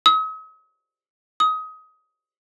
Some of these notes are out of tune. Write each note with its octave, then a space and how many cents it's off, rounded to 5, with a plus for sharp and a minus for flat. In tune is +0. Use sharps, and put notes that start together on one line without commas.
D#6 +45
D#6 +25